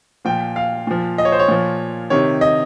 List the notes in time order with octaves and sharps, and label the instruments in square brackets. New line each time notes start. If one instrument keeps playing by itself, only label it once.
[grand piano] A#2 F3 G5
F5
A#2 F3
D#5
C#5
C5
C#5
A#2 F3
C3 D#3 C#5
D#5